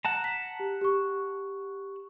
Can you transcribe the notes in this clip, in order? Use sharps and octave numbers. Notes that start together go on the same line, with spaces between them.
F#5 A5 A#5
B6
G4
G4 C#6